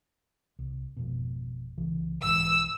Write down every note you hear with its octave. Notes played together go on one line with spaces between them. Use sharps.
C2
G#1 F2 B2
C2 C#3 E3
B1 G#2 E3 E6